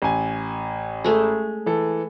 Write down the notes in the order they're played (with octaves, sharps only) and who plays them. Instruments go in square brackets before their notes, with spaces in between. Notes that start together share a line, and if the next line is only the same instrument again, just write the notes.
[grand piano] A1 G#5
[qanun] G#3 A3
[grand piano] E3 A4